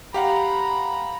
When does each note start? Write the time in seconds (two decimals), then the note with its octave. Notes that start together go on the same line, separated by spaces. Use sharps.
0.14 G4 F5 F#5 A#5 B5